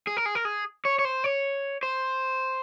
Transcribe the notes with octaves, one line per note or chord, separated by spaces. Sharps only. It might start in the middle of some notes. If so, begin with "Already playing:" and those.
G#4
A#4
G#4
A#4
G#4
C#5
C#5
C5
C#5
C5